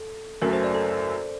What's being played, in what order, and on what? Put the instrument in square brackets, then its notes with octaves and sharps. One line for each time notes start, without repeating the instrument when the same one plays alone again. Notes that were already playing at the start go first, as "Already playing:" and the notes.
Already playing: [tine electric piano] A4
[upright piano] F#1 F#2 F#3 A3 [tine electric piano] A#4
[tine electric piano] C5
D5
A4